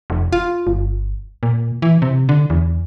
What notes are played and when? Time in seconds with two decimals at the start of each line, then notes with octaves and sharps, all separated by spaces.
0.10 F1
0.33 F4
0.67 G1
1.43 A#2
1.82 E3
2.02 C3
2.29 D3
2.50 E2